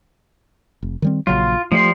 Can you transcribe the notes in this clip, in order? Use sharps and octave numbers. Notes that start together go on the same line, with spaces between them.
F1
D#3 G3 C4
A#1 C#3 F#3 F4
F3 G3 A3 C6